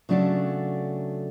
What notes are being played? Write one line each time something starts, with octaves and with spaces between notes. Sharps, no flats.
C#3 F#3 A3 D4 F#4